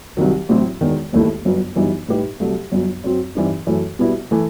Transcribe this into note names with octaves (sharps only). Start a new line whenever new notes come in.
C2 C3 D#3 F#3
A1 A2 F#3 C4 F#4
E1 E2 D#3
E1 D#2 D#3 A3 E4
G1 F#2 F#3 B3
G1 F#2 E3 G3 D#4
A2 G3 D#4 G4 B4
C2 C3 F#3 A3
G1 F#2 F#3
F#2 F#3 C4
G2 E3 G3 C4 D#4
F#2 E3 A3
B2 G3 B3 E4
E3 A3